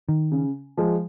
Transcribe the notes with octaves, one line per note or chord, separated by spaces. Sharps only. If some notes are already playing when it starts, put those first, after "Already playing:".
D#3
C#3
F3 G#3